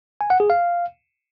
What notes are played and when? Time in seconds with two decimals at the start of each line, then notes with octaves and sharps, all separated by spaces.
0.21 G#5
0.30 F#5
0.40 G#4
0.50 F5